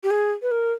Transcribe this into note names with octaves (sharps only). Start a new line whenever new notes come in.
G4
G#4
B4
A#4